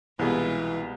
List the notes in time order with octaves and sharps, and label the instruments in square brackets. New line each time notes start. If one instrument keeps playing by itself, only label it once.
[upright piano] C2 B3 G#4 [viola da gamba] B2 G#3 F4 [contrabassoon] E3